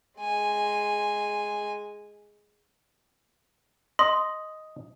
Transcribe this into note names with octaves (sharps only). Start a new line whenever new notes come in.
G#3 G#5
D#5 C6